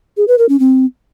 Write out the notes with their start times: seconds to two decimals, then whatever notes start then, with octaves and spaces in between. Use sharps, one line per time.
0.17 G#4
0.28 B4
0.38 A#4
0.49 C#4
0.60 C4